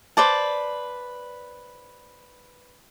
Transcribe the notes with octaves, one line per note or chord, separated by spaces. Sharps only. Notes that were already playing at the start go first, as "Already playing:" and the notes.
B4 C5 D5 A5